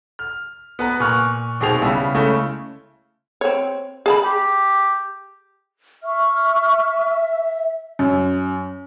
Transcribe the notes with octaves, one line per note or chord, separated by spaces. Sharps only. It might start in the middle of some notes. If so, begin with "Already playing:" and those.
F6
B3 B4 A#5
A#2 G#5 C#6 F6 F#6
D#2 B2 C4 G#4 C5 F7
C#3 G3 B3 E4
C#3 G#3 A3 C#4 E4
C4 C#5
G#4 A5 B5
G4
E5 C#6 F6
F#2